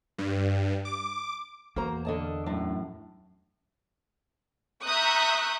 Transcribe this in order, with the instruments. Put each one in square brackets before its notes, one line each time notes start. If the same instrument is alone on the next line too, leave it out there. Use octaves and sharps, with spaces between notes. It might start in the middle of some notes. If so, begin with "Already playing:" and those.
[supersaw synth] G2
D6
[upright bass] E2 [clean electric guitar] A#3 [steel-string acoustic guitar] F#4 C5 A#5
[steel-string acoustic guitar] D3 D#5 A5
[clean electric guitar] F#2 A2 [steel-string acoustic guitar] D4
[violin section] E5 A#5 C#6 D#6 F#6 G6